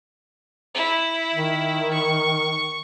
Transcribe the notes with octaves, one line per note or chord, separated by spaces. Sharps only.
E4
D#3
C#6